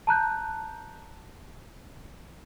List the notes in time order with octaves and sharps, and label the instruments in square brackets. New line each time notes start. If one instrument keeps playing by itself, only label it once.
[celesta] A5 A#5 F#6 G6